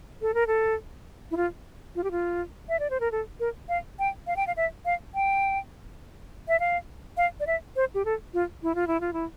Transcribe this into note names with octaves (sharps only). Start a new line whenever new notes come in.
A4
A#4
A4
E4
F4
F4
G4
F4
E5
D5
C5
A#4
A4
A#4
F5
G5
F5
G5
F5
E5
F5
G5
E5
F5
F5
D5
E5
C5
G4
A4
F4
E4
F4
E4
F4
E4